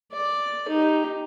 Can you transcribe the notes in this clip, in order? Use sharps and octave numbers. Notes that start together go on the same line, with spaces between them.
D5
D#4 G4